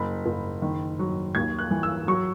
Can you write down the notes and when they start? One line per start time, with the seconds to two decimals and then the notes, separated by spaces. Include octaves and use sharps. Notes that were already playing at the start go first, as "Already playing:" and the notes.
Already playing: F#1 B5
0.26 F#1
0.62 D#3
0.99 F#3
1.35 D#2 G#6
1.59 F#6
1.71 E3
1.83 E6
2.07 F#3 C#6